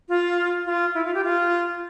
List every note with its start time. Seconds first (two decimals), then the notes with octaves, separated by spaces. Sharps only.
0.09 F4
0.66 F4
0.94 E4
1.05 F4
1.14 G4
1.24 F4